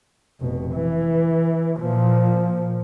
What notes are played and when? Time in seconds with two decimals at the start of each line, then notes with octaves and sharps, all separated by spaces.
0.41 F1 B2
0.74 E3
1.80 A#2 F3